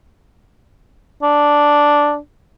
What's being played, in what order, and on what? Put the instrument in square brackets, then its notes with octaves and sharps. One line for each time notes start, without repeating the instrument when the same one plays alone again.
[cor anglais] D4